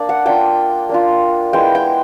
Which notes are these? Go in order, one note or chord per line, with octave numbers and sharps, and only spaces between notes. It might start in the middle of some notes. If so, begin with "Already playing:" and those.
Already playing: A#3 D4 D5
F#5
A#3 D4 F4 G5
A#3 D4 F4
G#3 B3 E4 G5
G5